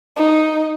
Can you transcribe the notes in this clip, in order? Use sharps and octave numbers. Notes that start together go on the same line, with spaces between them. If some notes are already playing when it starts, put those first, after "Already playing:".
D#4